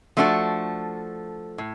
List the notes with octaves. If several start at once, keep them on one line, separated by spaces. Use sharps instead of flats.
F3 A3 D4 F#4 A4
A2